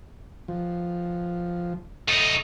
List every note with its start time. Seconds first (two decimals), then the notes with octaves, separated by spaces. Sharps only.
0.48 F3
2.09 A3 D#4